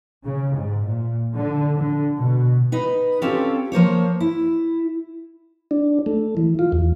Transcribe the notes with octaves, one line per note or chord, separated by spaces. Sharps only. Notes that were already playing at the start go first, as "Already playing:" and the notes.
C#3
G#2
A#2
D3
D3
B2
D#4 B4 D#5
C4 C#4 F4 G4 A4
F3 A#3 C5 C#5
E4
D4
A3
E3
F4
E2